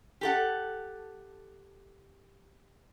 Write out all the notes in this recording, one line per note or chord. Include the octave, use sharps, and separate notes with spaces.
G4 A4 F#5